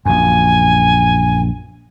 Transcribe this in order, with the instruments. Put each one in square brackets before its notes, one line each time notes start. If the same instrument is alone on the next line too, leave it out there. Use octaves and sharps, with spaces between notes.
[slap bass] A#1 F#2 [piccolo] G#5